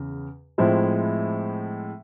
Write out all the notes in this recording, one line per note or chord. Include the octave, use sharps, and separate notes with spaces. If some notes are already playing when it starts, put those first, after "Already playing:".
Already playing: E2 C#3
A2 F3 G#3 C4 E4